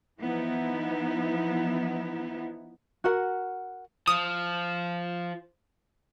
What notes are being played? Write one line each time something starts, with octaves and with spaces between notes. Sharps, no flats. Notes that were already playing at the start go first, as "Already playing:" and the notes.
E3 F3 B3 D#4 E4
F#4 A#4 F#5
F3 D#6